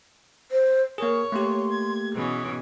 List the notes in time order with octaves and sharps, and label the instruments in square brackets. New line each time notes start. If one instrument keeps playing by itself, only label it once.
[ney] C5
[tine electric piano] A#3 G#4 [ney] A#4 [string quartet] C#5
[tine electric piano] A3 A#3 G4 [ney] C6
[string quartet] G#6
[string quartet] B2 E3 C#4 [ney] G#4